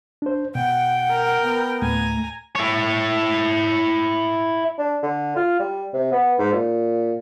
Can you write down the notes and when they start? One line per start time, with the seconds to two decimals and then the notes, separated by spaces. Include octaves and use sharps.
0.22 D4 C5
0.55 B2 F#5 G5
1.11 A#4
1.43 B3
1.82 D2 A2 A3 G#5 A#5
2.56 E4 C#5
4.79 D4
5.03 D3
5.36 F4
5.60 G3
5.93 C3
6.12 B3
6.38 G#2
6.52 A#2